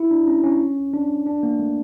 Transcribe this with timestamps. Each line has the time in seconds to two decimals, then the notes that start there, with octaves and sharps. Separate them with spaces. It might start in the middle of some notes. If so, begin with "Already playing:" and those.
Already playing: E4
0.11 D4
0.27 C#4
0.44 C#4
0.93 D4
1.26 D4
1.43 A#3
1.59 A3